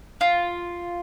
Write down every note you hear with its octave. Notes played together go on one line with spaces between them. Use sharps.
F4